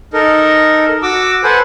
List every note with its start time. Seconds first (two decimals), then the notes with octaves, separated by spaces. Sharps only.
0.13 D#4 A4 A#4
1.02 F#4 D6 E6
1.44 A4 B4 C5 F#5 G#5